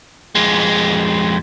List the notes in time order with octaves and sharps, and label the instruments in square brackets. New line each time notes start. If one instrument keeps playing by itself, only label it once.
[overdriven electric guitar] F2 G#3